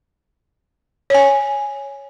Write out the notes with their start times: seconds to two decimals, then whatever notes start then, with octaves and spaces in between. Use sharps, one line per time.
1.10 C#5 G#5